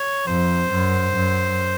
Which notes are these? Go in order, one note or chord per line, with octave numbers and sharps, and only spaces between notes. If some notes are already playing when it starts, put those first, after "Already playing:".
Already playing: C#5
F2 C5
F#2
F#2